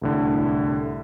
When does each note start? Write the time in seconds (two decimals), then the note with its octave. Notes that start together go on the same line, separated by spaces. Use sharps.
0.02 C2 A2 D3